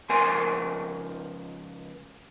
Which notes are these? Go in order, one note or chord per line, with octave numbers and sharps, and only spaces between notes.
C#2 F3 A#4 C5 G#5 C6